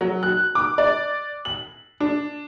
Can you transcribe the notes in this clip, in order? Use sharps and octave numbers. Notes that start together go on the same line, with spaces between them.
F#3
F#6
D6
D5
F#7
D4